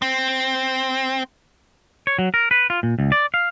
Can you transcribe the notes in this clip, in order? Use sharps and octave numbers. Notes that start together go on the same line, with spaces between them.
C4
C#5
F#3
A#4
B4
F4
A#2
C#2
D5
F5